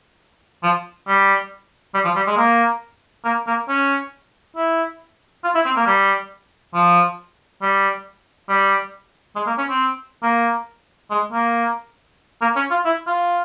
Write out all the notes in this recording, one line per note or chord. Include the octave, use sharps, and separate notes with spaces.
F3
G3
G3
F3
G3
G#3
A#3
A#3
A#3
C#4
E4
F4
E4
C4
A#3
G3
F3
G3
G3
G#3
A#3
C#4
C4
A#3
G#3
A#3
A#3
C#4
F4
E4
F4